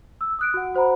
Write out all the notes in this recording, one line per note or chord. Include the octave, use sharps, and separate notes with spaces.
E6
D#6 F#6 D7
F#4 F#5
F#4 C5 F#5 A#5 B5